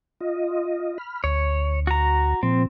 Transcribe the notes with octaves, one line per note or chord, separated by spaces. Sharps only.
F4 D#5
B5 F6
D2 C#5
F#4 A#5
A#2 F3 C4